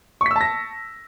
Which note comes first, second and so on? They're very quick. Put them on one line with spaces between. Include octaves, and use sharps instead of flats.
C#6 B6 E6 A5 A#6